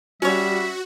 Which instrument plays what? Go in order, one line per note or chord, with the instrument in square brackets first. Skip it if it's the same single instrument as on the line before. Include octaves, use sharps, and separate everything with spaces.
[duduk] G3 [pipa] C#4 C#5 [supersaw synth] F#4 [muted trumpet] E5